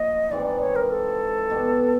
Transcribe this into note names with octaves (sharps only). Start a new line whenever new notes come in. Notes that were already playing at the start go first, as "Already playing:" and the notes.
Already playing: A#2 F3 A3 D#5
G#2 E3 G3 C4 D5
D5
C#5
A#4
A4
B2 G3 B3